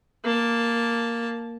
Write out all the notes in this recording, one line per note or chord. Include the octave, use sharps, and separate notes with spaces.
A#3 A5